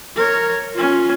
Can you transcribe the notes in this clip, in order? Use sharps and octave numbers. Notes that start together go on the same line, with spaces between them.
A#4 C#5
C#4 F4